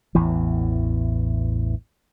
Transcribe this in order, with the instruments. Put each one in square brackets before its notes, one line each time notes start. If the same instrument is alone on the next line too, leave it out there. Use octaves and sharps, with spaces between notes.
[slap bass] A1 E2 E3